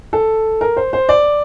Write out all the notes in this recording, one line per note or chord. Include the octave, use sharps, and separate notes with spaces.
A4
A#4
C5
C5
D5